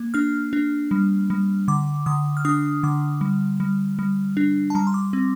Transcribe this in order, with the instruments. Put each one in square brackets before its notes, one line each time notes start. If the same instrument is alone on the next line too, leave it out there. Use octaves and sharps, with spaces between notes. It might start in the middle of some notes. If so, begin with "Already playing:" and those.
Already playing: [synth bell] A#3
D4 F6
D4
G3
G3
D3 D6
D3 D#6
F6
D4 D#6
D3 D6
G3
G3
G3
D4
A5
G3 A#5
C6
D6
C4